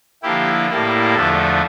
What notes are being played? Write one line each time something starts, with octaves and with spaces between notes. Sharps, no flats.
D3 F3 A#3 E4 G4
A2 G3 A#3 E4
E2 D3 F3 A3 A4